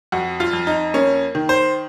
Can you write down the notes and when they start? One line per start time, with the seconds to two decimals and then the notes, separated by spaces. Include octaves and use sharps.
0.12 F2 F#4
0.40 F4
0.53 F2
0.67 D#4
0.94 A#3 C#4
1.35 D#3
1.49 C5